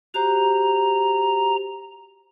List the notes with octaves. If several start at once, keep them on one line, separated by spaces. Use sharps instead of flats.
F#4 G4 C5 A#5